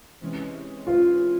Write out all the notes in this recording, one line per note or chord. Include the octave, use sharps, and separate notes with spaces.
C3 E3 G#3 C#4
F4